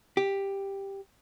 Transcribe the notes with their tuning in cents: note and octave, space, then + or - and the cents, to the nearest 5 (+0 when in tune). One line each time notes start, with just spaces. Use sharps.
G4 +5